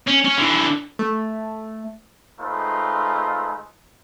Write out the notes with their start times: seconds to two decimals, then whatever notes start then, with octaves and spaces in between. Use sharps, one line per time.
0.07 C#4
0.25 C#4 C#5
0.37 D3 E3
0.99 A3
2.40 G#3 A3 D#4 F4 B4 C5